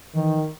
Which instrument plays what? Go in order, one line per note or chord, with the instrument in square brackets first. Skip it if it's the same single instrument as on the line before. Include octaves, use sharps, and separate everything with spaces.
[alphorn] D#3 [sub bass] E3